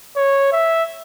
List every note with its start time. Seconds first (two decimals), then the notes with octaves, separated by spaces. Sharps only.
0.16 C#5
0.52 E5